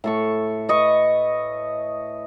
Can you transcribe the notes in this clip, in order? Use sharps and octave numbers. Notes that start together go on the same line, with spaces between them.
A2 A4 C#6
B4 D#5 C#6